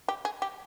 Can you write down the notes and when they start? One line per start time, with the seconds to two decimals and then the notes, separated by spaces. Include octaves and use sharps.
0.08 G4
0.25 G#4
0.42 G4